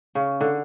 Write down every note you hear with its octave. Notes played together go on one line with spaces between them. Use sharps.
C#3
D3